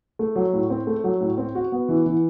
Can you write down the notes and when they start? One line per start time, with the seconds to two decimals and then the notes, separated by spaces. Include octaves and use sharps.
0.19 A3
0.36 F#3
0.53 A2
0.70 C4
0.87 A3
1.04 F#3
1.21 A2
1.38 C4
1.55 F#4
1.72 B3
1.89 E3
2.06 E3